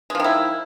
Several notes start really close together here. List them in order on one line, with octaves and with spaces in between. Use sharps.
G#3 F3 D#3 E4